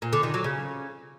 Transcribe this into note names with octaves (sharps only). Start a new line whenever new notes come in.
A#2
D3
D#3
F#3
C#3